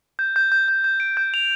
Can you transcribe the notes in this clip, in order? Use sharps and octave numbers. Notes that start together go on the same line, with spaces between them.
G6
G6
G6
G6
G6
D7
G6
F7